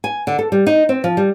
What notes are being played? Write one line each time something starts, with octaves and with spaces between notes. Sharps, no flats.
G#5
D3
A4
G3
D#4
C4
F3
G3